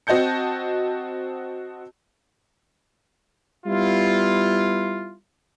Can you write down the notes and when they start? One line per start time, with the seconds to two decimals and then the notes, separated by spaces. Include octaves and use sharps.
0.07 C4 F#4 D#5 A5 G6 C#7
3.66 G3 B3 E4 F4